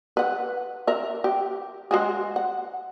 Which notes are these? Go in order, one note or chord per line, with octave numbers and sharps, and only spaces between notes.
B4 F#5
A#4 E5
G4
G#3 F#4 G#4
F#5